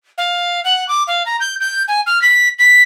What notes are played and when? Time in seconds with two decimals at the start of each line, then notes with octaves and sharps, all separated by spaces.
0.18 F5
0.65 F#5
0.89 D6
1.07 F5
1.26 A#5
1.40 G6
1.60 G6
1.88 G#5
2.07 F6
2.22 B6
2.59 B6